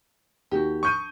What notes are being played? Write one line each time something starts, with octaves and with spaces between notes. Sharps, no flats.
D#2 F#4 G4
D4 C#6 D#6 G6 D#7